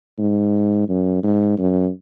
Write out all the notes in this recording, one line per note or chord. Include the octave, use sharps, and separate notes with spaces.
G#2
F#2
G#2
F#2